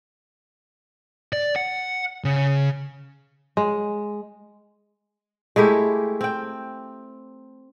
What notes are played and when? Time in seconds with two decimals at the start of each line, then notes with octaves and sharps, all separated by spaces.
1.33 D5
1.56 F#5
2.25 C#3
3.57 G#3
5.56 G#3 A3 E4 G4
6.21 C4 G5